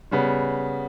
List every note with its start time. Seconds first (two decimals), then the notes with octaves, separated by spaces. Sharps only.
0.11 C#3 G3 B3